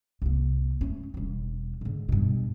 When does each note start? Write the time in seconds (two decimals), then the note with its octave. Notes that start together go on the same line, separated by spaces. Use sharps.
0.22 C2 A#3
0.81 A3 C#4
1.14 E1 G3
1.81 G#2 D3
2.09 G2 B2